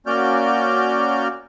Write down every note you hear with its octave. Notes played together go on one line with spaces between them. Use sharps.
A#3 C#4 F#4 D5 F6 G6